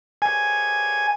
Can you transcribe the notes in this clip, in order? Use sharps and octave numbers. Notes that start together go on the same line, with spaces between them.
G#5